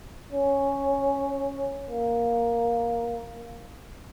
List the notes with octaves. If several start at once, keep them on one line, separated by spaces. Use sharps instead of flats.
C#4
A#3